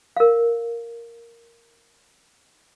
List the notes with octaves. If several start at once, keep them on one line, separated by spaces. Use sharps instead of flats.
A#4 F5